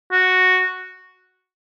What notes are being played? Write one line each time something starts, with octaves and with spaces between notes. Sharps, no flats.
F#4